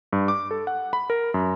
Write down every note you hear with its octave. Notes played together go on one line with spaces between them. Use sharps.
G2
D6
A4
F#5
B5
A#4
F#2